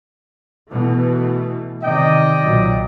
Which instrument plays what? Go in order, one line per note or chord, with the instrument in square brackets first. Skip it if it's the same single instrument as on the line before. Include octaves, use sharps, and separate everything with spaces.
[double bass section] B2 E3 A3
[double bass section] C3 D#3 [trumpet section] D5 D#5 G5
[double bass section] B1 A#2 F#3